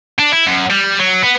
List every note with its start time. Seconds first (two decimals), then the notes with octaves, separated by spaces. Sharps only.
0.19 D4
0.32 E4
0.47 F#2
0.71 G3
1.00 F#3
1.23 B3